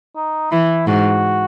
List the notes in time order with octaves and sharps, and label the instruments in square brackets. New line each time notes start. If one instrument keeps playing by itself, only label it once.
[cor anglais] D#4
[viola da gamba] E3 [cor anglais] E4
[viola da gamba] G#2 [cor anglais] F#4